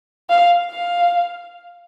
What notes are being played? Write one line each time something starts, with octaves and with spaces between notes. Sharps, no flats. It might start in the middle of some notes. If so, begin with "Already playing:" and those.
F5
F5